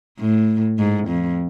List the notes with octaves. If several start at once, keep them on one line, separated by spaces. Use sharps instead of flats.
A2
G#2
F2